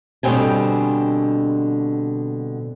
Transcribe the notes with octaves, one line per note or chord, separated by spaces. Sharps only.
B2 D3 G3 C4 G5 G#5